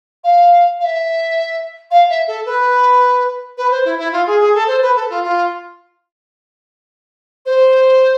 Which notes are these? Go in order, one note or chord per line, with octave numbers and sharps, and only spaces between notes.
F5
F5
E5
F5
E5
A4
B4
B4
C5
E4
E4
F4
G#4
G#4
A4
C5
B4
A4
F4
F4
C5